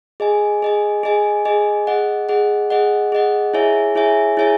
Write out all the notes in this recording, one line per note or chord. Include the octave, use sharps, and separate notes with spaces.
G#4 D#5 G#5
G#4 D#5 G#5
G#4 D#5 G#5
G#4 D#5 G#5
G#4 D#5 F#5
G#4 D#5 F#5
G#4 D#5 F#5
G#4 D#5 F#5
E4 G#4 C#5 E5 G#5
E4 G#4 C#5 E5 G#5
E4 G#4 C#5 E5 G#5